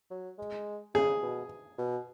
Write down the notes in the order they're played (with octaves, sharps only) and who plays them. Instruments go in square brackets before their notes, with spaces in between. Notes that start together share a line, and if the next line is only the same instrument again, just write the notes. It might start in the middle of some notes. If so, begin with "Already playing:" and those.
[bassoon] F#3
G#3
[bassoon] C#3 [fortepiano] G#4
[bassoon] B2
B2